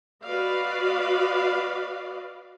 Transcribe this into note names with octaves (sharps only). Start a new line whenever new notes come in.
F#4 B4 D5 D#5 F5